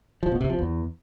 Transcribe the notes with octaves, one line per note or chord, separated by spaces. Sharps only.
F3
B2
C3
F3
E2